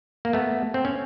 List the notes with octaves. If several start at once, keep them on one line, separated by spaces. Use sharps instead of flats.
A#3
A3 B3
C4
C#4